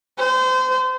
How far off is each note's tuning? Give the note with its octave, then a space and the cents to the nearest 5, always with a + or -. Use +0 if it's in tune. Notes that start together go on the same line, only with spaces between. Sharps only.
C5 -30